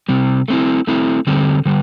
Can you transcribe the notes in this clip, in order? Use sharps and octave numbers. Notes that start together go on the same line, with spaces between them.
C3 G3 C4
A3 C4 E4
A3 C4 E4
D3 G3 C4
D3 G3